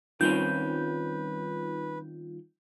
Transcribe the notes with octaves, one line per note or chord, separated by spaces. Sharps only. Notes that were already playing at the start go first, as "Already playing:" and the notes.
D#3 G3 C4 C#4 D#4 F4 B4 G6